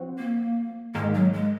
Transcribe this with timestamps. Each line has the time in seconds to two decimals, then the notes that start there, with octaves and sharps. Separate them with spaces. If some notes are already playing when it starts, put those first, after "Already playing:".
Already playing: F3 C4 F#4
0.18 A#3
0.95 G#2 D#3 G#3 A#3
1.14 F#3
1.33 G#3